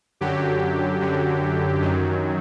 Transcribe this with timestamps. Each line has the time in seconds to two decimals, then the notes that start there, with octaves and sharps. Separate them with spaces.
0.21 F#2 D3 F#3 G4
1.01 F#2 D3 F#3
1.81 F#2 D#3 F#3